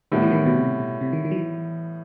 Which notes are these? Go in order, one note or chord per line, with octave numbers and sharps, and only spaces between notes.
A2 D#3 G3 B3
E3
D#3
B2
C3
B2
C3
D#3
D#3
F#3
E3